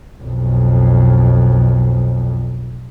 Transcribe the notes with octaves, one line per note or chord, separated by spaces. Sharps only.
B1 F2